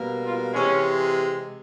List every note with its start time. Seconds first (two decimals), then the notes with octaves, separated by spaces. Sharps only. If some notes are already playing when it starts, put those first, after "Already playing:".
Already playing: B2 G3 A#3
0.23 F4
0.54 C3 E3 G#3 C#4